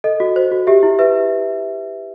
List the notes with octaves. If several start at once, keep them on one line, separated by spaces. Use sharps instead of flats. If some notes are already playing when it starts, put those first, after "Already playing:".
A4 D#5
F#4
C5
F#4
G4 E5
E4
B4 E5